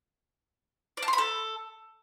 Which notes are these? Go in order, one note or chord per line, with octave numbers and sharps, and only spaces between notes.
D5
A5
C6
B5
A4